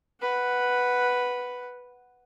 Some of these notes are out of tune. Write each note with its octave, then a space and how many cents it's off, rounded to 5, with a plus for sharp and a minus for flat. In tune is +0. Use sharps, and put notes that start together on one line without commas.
B4 +0 F#5 +0